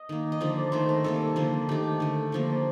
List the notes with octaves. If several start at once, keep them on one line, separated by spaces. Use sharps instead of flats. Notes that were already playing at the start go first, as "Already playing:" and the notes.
Already playing: D#5
D#3 A#3
D#5
D3 F3 A#3 D5
D#3 A3 C5
A#4
C3 G3 A#3 A4
D3 F3 A#3
D#3 A3 G4
D3 A3
D3 F3 A#3